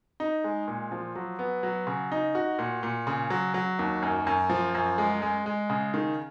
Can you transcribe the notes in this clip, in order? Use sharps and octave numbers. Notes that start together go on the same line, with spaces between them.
D#4
G#3
A#2
F3
F#3
B3
F#3
C#3
D#4
F#4
A#2
A#2
C#3
F#3
F#3
D#2
F#2
F#2
F3
F#2
G#3
G#3
G#3
C#3
D#3